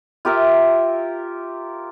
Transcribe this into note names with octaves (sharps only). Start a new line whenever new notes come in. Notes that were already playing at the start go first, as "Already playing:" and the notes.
F4 G4 A#4 E5